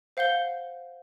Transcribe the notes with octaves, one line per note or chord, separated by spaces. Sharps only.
C5 F5 F#5 G6 G7